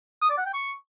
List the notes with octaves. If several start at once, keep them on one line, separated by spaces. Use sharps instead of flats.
D#6
D5
F#5
G5
C#6